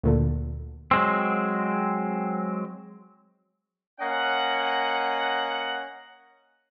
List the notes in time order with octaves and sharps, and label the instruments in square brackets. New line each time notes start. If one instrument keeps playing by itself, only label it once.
[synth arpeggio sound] D2 A#2 D3
[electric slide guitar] F#3 G#3 C4
[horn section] A#3 C#4 D#5 F#5